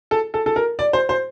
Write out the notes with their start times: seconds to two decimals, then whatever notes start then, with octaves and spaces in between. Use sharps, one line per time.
0.11 A4
0.34 A4
0.46 A4
0.56 A#4
0.79 D5
0.93 C5
1.09 C5